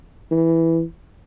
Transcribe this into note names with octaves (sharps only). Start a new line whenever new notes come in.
E3